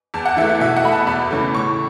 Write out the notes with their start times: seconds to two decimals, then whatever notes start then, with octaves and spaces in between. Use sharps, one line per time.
0.14 E2 A5
0.26 F#5
0.37 E3 E5
0.41 A3
0.49 E5
0.60 B2 E5
0.77 F#5
0.84 A3 B5
0.92 A5
1.07 E2 B5
1.31 C#3 E3 A3
1.54 A2 C#6